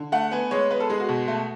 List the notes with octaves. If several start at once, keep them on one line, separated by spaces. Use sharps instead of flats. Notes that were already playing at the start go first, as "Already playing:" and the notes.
Already playing: D3
A3 F#5
B3 G#5
G#3 C#5
B3 B4
A4
G#3 G#4
F#4
B2
A3